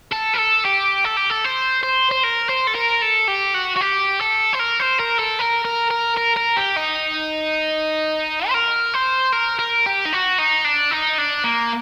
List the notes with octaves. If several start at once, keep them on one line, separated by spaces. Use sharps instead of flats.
A4
A#4
A4
G4
A4
G4
A4
C5
C5
C5
A#4
C5
A4
A#4
A4
G4
F#4
F#4
G4
A4
C5
A#4
C5
A#4
A4
A#4
A#4
A#4
A#4
A#4
G4
D#4
C5
A#4
C5
A#4
A#4
G4
D#4
F#4
D#4
D4
D#4
D4
A#3